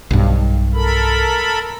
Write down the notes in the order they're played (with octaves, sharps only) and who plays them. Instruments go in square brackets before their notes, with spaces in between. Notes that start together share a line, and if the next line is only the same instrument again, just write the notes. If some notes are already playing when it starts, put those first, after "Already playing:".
[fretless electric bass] B1 G2
[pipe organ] A4 A#4 B5